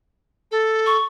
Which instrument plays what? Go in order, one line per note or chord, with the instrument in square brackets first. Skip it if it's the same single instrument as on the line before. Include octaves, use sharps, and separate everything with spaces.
[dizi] A4
[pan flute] C#6